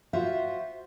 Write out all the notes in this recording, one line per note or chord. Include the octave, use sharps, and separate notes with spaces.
F4 F#4 C5 E5